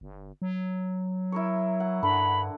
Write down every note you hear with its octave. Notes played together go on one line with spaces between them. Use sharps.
G1
F#3
E4 A#4 C#5
F#5
G2 D3 B5